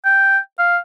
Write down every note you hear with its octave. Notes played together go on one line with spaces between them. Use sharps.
G5
F5